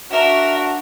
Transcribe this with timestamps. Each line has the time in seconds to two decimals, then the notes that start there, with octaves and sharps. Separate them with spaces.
0.11 D4 F#4 A#4 E5